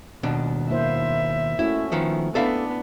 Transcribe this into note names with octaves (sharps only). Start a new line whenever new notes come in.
D#2 B2 D4
A#3 E4 C5 E5
A3 C#4 E4 F#4
D#3 F3 B3
B3 D4 E4 A4 D5 E5 F5